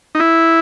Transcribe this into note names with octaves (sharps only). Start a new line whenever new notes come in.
D#4
E4